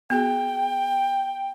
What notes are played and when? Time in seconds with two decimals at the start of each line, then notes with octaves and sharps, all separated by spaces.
0.10 B3 F#4 G#4 G5